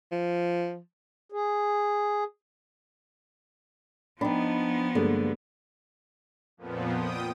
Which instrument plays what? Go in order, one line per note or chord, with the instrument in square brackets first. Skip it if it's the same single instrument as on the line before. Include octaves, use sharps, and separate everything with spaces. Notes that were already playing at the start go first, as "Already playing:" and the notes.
[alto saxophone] F3
[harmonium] G#4
[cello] F3 B3 [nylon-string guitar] D4 D#4 [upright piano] D#5 G5 B5
[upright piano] G2 G#3 A#3 [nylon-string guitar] D3
[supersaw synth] F2 A#2 F3 B3
G5 D#6